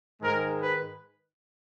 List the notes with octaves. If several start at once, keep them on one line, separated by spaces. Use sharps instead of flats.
G#2 D#3 G#3 A#4
B4